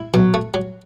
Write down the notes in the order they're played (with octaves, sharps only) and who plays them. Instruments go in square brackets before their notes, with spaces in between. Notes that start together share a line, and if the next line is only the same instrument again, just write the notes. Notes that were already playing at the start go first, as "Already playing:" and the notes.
Already playing: [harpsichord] E4
[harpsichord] B2 [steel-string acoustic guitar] F#3
[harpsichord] A3
F#3